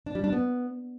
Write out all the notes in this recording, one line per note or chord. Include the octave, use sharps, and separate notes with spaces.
D4
G3
D4
B3